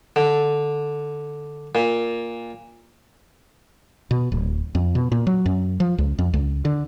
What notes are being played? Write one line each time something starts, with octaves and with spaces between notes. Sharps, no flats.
D3
A#2
B2
D1
F2
B2
A#2
F#3
F#2
F3
C#2
F2
C#2
D3